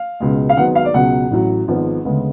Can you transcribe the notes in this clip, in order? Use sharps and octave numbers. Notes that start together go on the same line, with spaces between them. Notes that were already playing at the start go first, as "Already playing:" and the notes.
Already playing: F5
C#2 B2 G#3
F5
G#1 G#2 F#3 B3 F#5
F5
D5
C#2 B2 F#3 B3 F#5
A1 A2 F#3
G#1 G#2 F3 B3
D2 C#3 G#3 B3